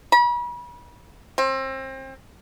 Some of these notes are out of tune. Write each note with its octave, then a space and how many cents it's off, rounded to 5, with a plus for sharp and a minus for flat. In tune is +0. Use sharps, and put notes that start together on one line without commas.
B5 -40
C4 +30